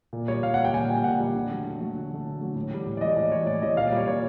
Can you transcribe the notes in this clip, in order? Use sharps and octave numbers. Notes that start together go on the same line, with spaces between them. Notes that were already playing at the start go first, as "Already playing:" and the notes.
A#2
G3 C#5
A#2 F5
F#5
G3
G5
A#2 G#5
G3 G5
A#2 F#5
G3
D3
F#3 A3
D3
F#3 A3
D3
F#3 A3
D3
F#3 A3
A2
E3 G3
A2
D5
E3 G3 D#5
A2 D5
E3 G3 C#5
A2 D5
E3 G3 D#5
A#2 F5
D5
G3 C#5
A#2 C#5